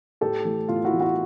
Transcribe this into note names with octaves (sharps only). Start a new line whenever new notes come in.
A2 G4 A4
E3 A3
A2 F4
E4 F#4
E3 A3
E4 F#4